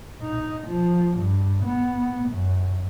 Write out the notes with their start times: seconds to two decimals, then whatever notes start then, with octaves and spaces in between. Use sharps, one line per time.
0.22 D#4
0.68 F3
1.17 G2
1.64 B3
2.30 F#2